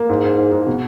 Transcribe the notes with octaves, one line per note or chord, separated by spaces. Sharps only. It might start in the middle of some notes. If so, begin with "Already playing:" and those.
Already playing: A#3
G#2
G#2
G#2
G#2
B2